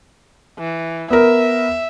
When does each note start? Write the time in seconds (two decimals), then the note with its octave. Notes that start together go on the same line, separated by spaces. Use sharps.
0.59 E3
1.10 B3 A#4 E5